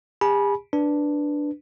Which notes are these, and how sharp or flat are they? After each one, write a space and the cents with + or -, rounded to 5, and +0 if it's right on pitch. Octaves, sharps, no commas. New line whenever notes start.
G4 +45 G#5 +30 B5 -25
D4 +0 B4 +0